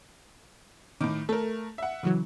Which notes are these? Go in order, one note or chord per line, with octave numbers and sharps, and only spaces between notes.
A2 D#3 D6
A3 A4 A#4
E5 F#5
C#3 E3 F#3